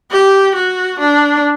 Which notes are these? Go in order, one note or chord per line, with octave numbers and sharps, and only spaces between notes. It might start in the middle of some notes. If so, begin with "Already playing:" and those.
G4
F#4
D4